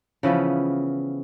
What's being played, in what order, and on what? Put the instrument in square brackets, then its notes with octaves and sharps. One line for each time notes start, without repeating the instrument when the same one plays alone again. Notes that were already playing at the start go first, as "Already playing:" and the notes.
[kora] C#3 E3 F3 B3